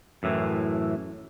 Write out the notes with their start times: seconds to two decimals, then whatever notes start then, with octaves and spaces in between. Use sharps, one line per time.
0.23 F#2 A2 E3